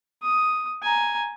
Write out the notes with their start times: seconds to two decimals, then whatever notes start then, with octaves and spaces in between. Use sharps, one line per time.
0.23 D#6
0.82 G#5 A#5